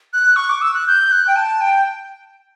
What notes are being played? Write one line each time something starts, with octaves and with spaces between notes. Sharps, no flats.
F#6
C#6
D6
E6
F#6
G6
F#6
G5
A5
G5